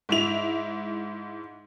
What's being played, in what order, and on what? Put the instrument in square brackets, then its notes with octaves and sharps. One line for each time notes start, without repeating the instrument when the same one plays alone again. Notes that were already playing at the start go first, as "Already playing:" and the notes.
[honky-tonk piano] G#2 E4 F7